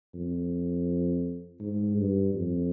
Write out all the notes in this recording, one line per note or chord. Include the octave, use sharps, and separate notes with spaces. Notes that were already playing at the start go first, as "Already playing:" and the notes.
F2
G#2
G2
F2